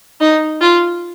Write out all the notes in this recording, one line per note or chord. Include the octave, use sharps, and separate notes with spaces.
D#4
F4